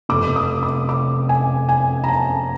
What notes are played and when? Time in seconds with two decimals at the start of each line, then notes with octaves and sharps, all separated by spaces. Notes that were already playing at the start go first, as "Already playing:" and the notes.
0.09 F1 F2 C3 D6
0.36 D#6
0.63 D6
0.89 D6
1.29 G#5
1.69 G#5
2.04 A#5
2.08 A5